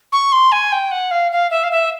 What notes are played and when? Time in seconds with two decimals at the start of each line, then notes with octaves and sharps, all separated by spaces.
0.12 C#6
0.32 C6
0.52 G#5
0.72 G5
0.91 F#5
1.11 F5
1.32 F5
1.51 E5
1.63 F5
1.71 E5